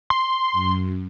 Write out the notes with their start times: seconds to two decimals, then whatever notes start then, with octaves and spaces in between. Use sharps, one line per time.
0.10 C6
0.52 F#2